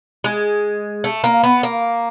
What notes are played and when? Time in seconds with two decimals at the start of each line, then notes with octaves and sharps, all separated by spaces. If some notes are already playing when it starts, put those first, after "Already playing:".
0.24 G#3
1.04 A3
1.24 A#3
1.43 B3
1.63 A#3